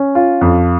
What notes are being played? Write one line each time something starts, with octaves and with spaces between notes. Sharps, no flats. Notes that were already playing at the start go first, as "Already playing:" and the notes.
Already playing: C#4
F4
F2